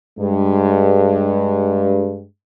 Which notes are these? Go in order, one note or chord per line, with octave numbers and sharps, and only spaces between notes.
G2 G#3